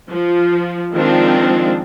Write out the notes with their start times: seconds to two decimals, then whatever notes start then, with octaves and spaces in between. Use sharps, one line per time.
0.10 F3
0.94 D#3 F3 G#3 C4 D4